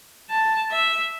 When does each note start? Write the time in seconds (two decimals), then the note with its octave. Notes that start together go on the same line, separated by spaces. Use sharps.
0.30 A5
0.72 E5